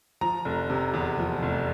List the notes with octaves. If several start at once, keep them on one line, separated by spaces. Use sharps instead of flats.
F3 A#5
F1
C3
E2
F3
F1